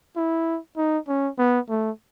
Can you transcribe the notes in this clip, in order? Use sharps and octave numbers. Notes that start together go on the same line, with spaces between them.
E4
D#4
C#4
B3
A3